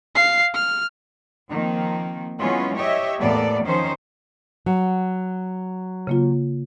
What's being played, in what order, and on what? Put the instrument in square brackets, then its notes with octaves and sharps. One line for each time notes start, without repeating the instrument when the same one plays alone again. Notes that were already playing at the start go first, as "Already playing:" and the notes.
[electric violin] F5 C7
F6
[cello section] D#3 F3 A#3 C4
E3 F#3 G#3 B3 C#4 F4
G4 C#5 D#5 E5
E2 A2 A#3 B3 A4 D5
D#3 F3 C#4 D#4 C5
[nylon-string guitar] F#3
[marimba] C#3 A#3 F4